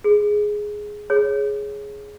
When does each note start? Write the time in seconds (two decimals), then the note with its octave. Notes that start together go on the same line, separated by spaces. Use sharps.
0.04 G#4
1.10 G#4 C#5